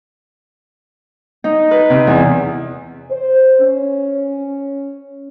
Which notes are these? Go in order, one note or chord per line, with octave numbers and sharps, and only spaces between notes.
D#4
B4
C3
E2
C5
C#4